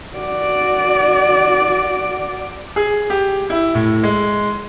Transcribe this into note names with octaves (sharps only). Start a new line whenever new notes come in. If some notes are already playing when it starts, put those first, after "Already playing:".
F#4 D5
G#4
G4
E4
A2
G#3